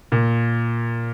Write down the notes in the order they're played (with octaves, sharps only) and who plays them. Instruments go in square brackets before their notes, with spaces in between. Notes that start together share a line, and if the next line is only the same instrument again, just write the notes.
[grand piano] A#2